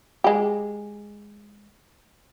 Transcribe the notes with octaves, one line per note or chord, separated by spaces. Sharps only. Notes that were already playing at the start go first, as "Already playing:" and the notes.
G#3 G4